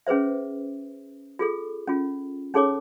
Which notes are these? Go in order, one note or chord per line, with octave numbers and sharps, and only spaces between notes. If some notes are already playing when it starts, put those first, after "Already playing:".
C#4 G#4 B4 C5 E5
F4 G#4 A4
C#4 F4
C#4 D#4 G#4 A4 C#5 D6